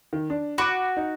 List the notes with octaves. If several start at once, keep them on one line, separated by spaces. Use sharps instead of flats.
D#3
D4
F#4 B5 D6 D7
D#4